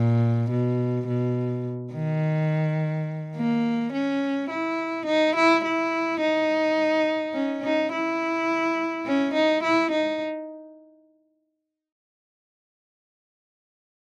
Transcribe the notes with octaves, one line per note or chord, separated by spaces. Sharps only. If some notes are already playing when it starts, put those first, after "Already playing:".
Already playing: A#2
B2
B2
D#3
A#3
C#4
E4
D#4
E4
E4
D#4
C#4
D#4
E4
C#4
D#4
E4
D#4